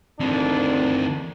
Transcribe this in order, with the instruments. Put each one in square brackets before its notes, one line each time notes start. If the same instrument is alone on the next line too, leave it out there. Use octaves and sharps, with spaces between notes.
[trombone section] D2 D#3 D4 [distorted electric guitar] E3 C4